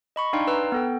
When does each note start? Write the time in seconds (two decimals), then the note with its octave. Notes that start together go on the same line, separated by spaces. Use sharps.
0.16 D#5 B5 C#6
0.33 D4 D#4 D5 F5 G5 C6
0.47 B4 A#5 E6
0.72 B3 A4 G5